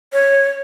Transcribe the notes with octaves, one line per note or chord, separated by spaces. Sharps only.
C#5